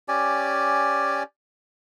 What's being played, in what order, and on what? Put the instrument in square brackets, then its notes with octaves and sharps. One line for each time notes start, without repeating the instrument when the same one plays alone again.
[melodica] C#4 G4 D5 G#5